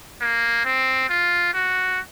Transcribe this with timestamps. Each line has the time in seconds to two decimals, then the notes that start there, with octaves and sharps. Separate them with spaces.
0.21 A#3
0.65 C4
1.10 F4
1.54 F#4